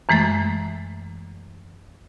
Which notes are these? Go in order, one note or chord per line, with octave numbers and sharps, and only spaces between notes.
F#2 E3 G#3 A3 A6